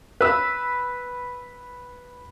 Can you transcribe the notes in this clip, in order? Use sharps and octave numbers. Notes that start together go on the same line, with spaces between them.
B4 E6